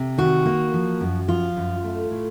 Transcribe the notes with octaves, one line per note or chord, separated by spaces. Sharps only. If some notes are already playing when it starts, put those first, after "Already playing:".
Already playing: C3
D#3 F#4
A#3
F3
F#2
F3 F4
F#2
A3
A2